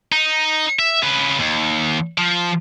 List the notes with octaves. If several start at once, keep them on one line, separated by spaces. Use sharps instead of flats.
D#4
E5
C#3 B4
D#2
F3